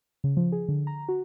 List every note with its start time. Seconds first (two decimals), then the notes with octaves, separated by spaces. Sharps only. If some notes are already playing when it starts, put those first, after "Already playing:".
0.24 C#3
0.37 F3
0.52 G#4
0.68 D3
0.87 A#5
1.09 F#4